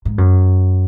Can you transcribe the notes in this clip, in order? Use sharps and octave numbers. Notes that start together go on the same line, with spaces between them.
G#2
F#2